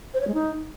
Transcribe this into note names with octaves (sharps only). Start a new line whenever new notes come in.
C5
C#5
G#3
D#4